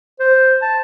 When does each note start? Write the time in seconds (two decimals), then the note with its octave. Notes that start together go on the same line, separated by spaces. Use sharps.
0.20 C5
0.62 A5